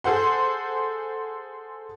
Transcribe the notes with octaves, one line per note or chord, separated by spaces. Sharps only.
G#4 A4 C5 F#5 C6